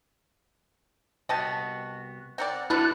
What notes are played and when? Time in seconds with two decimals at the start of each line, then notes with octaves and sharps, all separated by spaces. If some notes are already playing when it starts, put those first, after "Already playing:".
1.29 C2 B3 F#4 D#5 G5 A5
2.38 C4 A#4 D5 F#5
2.70 B3 D4 E4 F#4 A4 F#6